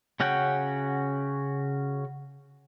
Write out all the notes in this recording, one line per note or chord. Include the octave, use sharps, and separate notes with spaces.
C#3 C#4 F#4 F#5 G5